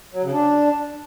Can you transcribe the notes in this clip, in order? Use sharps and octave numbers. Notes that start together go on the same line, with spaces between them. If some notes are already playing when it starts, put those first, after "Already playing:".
F#3
C#3
D4